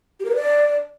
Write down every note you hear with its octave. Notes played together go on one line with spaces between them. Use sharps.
G4
A#4
B4
D5